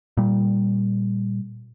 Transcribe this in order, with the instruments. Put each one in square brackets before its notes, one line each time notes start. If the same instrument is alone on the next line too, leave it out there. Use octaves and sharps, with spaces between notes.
[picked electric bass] A#2 G3